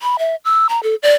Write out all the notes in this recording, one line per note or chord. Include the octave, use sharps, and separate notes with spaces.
B5
E5
E6
A#5
A4
D5